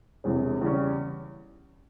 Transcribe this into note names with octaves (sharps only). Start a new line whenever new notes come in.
E1 E2 C3
E2 C#3 G3 C#4